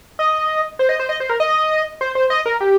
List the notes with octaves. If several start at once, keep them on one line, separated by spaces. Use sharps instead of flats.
D#5
C5
D#5
C5
D#5
C5
A#4
D#5
C5
C5
D#5
A#4
G4